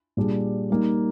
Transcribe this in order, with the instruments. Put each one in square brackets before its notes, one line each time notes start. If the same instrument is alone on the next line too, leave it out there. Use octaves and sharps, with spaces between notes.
[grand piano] A#2 G3 D4 G#4
G3 A#3 D#4